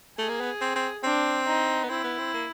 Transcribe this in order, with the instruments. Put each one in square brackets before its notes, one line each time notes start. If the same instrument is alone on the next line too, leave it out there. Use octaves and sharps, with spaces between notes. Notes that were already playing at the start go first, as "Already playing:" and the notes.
[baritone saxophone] A3 [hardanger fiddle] G#4
[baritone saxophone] A#3
B3
C4
C4
[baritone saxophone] C4 [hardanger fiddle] D4
[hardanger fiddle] D#4
[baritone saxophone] B3
[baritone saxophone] C4 [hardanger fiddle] E4
[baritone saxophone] B3
C4
A#3